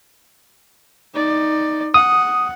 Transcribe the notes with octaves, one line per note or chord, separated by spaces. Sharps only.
D#4 D5
F#5 D#6